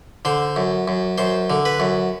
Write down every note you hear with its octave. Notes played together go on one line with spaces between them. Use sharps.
D3 C5
F#2
F#2
F#2 C5
D3
B4
F#2